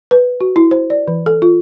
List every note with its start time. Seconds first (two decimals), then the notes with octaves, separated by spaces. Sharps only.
0.11 B4
0.41 F#4
0.56 E4
0.71 C5
0.90 D5
1.08 E3
1.26 A4
1.42 F4